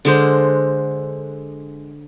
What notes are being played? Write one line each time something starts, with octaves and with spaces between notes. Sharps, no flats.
D3 G#3 C5